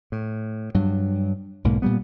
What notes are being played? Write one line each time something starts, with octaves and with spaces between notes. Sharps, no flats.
A2
G2 F#3
B1 G#2 A#3
A#2 G3 B3